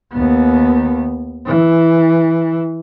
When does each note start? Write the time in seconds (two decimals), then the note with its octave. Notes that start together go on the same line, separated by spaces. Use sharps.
0.13 D#2 B3
1.46 E3